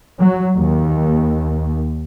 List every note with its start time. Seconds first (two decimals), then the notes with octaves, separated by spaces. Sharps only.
0.21 F#3
0.56 D#2